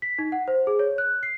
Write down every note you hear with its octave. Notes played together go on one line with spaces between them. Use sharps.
B6
D#4
F#5
C5
G#4
C#5
F#6
C7